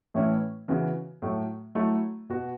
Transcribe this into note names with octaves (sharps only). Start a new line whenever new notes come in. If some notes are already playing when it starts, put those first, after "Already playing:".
A2 E3 A3 C#4 E4
C#3 E3 B3 F#4
A2 F#3 A3
F#3 A3 E4
B2 B3 F#4